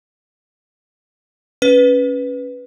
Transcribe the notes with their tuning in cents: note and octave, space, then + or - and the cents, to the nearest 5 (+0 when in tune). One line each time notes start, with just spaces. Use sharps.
C#4 +0 B4 +0